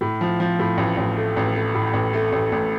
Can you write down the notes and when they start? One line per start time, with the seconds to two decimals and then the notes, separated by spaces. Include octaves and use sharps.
0.01 A2
0.21 F3
0.40 F3
0.59 A2
0.77 A1
0.97 A1
1.17 A3
1.36 A1
1.55 A3
1.74 A2
1.93 A1
2.13 A3
2.32 A1
2.52 A1